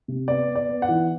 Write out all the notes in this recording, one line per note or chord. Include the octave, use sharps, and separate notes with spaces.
C3
B3 D5
B3
D5
B3
F#5
E3